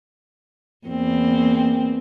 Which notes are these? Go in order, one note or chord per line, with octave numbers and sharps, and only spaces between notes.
E2 A#3 C4